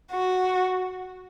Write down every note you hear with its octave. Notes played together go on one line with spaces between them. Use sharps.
F#4